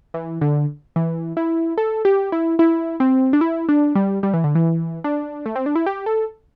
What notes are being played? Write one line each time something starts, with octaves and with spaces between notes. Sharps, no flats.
E3
D3
E3
E4
A4
G4
E4
E4
C4
D4
E4
D4
G3
G3
E3
D3
E3
D4
A3
C4
D4
E4
G4
A4